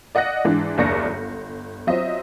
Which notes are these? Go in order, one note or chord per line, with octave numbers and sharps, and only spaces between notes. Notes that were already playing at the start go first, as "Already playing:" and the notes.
D5 D#5 F#5 F#6 A#6
G#2 E3 D4
F#1 D#2 D5 C#6 A#6 C#7
G1
F#3 C4 F4 C5 D#5 E5